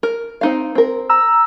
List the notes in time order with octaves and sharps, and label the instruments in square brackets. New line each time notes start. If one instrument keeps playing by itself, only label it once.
[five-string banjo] A#4
C4 D#4 F5
C4 A#4
[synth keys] A#5 E6